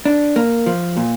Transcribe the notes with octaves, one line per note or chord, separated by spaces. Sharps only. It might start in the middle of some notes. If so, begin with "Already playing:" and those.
D4
A#3
F3
A#2